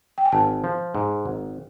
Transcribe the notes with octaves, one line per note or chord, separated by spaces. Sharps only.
G5
G#5
G#1 A5
F3
G#2
G#1